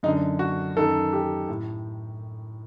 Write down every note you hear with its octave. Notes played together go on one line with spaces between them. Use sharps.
F#2 D3 D#4
F#4
F#2 D#3 A4
G4
A2